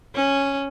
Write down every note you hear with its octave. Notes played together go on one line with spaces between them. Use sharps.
C#4